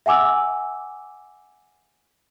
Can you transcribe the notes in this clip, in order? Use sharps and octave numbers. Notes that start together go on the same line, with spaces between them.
E5 F#5 G#5 D6 E6